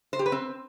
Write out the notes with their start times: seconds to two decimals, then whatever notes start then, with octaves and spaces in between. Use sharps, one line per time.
0.13 C5
0.19 G4
0.26 B4
0.32 C4